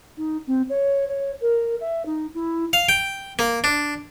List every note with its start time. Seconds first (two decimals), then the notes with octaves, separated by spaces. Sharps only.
0.17 D#4
0.47 C4
0.69 C#5
1.08 C#5
1.41 A#4
1.80 E5
2.05 D#4
2.34 E4
2.73 F5
2.89 G5
3.39 A#3
3.64 D4